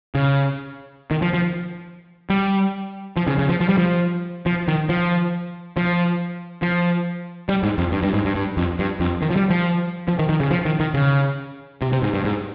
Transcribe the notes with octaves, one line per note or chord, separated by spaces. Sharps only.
C#3
D#3
F3
F3
G3
F3
C#3
C#3
F3
F3
G3
F3
F3
D#3
F3
F3
F3
G3
G#2
F2
G2
G2
G#2
G2
G2
F2
G2
F2
D#3
F3
G3
F3
F3
D#3
D#3
C#3
F3
D#3
D#3
C#3
C3
C3
G#2
G2
G#2